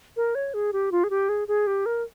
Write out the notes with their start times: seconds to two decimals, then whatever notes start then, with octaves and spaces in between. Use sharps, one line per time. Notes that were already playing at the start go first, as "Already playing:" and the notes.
0.16 A#4
0.35 C#5
0.54 G#4
0.73 G4
0.92 F4
1.04 G#4
1.10 G4
1.29 G#4
1.48 G#4
1.67 G4
1.86 A#4